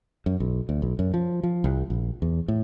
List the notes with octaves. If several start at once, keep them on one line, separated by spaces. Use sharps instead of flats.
F#2
B1
D2
B1
F#2
F3
F3
C2
A#1
E2
A2